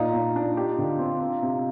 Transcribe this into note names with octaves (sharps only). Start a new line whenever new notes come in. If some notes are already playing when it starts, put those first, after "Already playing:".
Already playing: A#2 D#4 F4
A#2
D4
G4
D3
C4
C4
C3